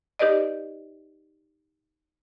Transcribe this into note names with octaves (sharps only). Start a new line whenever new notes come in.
D#4 G4 B4 D5 D#5